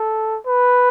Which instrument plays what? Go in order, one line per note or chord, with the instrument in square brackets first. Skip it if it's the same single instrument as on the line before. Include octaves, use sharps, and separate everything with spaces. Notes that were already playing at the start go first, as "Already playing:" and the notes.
Already playing: [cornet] A4
B4